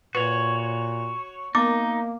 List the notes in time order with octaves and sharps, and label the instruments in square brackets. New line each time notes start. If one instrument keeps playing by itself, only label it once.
[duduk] A#2 [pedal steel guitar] F#4 C#5 [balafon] B4
[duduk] A#3 [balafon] B3 A#4 [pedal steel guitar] D#4 [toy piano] D6